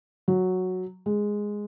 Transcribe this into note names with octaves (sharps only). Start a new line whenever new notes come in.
F#3
G#3